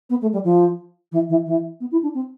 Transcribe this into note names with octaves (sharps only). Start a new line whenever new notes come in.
B3
A3
G3
F3
E3
E3
E3
B3
E4
D4
C4